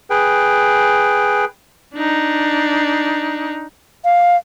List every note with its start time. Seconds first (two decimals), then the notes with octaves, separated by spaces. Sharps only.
0.10 G#4 B4 G5
1.95 D4 D#4
4.04 F5